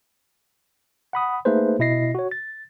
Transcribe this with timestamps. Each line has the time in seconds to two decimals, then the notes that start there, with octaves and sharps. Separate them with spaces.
1.13 F#5 B5 D#6
1.45 A3 A#3 D#4 G#4 B4 C5
1.79 B2 E4 D#5 A#6 C7
2.15 F#4 C#5
2.31 A6